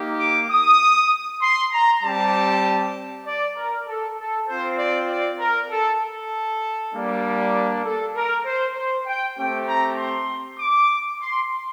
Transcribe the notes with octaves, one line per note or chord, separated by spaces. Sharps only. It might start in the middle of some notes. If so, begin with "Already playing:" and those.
Already playing: A#3 D#4 G4
D6
D#6
C6
A#5
G3 C4 G4 A5
D5
A#4
A4
A4
C4 F4 C5
D5
D5
A#4
A4
A4
G3 A#3 D4
A4
A#4
C5
C5
G5
A3 C4 G4 G5
A#5
C6
D6
C6